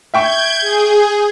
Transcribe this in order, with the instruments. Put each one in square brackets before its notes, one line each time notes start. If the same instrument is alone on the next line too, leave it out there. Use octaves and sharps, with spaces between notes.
[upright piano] E5 G5 C#6 [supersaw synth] G6 G#6
[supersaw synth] G#4